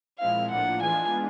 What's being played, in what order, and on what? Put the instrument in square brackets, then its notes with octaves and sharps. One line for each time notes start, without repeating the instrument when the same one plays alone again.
[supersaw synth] A#2 F3 G#3 C4 E4 [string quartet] F5
[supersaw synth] A2 F3 A#3 D4 F4 [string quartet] F#5
[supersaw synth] E3 G#3 B3 D4 F4 [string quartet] G#5